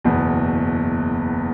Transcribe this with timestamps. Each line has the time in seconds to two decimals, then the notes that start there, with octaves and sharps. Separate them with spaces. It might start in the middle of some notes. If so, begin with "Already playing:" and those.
0.05 F#1 E2 B2